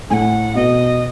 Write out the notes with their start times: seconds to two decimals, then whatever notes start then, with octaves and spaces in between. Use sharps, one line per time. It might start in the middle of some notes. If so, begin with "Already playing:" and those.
0.10 A2 A3 F#5 G#5
0.55 B2 B3 D#5